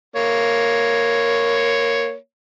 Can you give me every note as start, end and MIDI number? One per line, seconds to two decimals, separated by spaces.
0.16 2.15 58
0.16 2.15 73